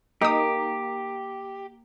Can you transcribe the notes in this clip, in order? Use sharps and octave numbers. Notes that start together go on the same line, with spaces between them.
A#3 D#4 G4 D#6